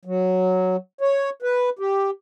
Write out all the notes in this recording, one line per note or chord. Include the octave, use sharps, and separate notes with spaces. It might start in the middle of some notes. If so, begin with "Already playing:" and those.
F#3
C#5
B4
G4